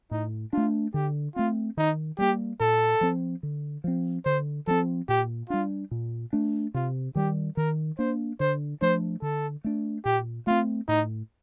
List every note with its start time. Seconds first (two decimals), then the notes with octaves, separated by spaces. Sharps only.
0.11 A2 D#4
0.53 A3 D4 F4
0.94 D3 G4
1.35 A3 C4 F4
1.77 D#3 D#4
2.18 G3 A#3 G4
2.60 A#2 A4
3.01 F3 C4
3.43 D3
3.84 F3 C4
4.25 D3 C5
4.67 F3 A3 C4 A4
5.09 A#2 G4
5.50 G3 D4 F4
5.91 A#2
6.33 A3 D4
6.74 C3 F4
7.15 D#3 G3 G4
7.57 D#3 A#4
7.98 A#3 D4 C5
8.40 D3 C5
8.81 F3 A3 D4 C5
9.22 D3 A4
9.64 A3 D4
10.05 A#2 G4
10.47 A3 C4 F4
10.88 A2 D#4